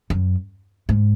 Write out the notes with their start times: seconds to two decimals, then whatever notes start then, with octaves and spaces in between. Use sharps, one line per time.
0.10 F#2
0.89 G#2